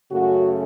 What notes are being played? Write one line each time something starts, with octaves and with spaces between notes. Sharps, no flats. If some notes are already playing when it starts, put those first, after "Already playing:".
F#2 C#3 A3 C#4 F#4